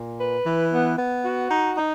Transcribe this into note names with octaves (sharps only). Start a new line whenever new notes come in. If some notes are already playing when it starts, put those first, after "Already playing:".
Already playing: A#2
B4
E3
B3
B3
F#4
D#4
D#4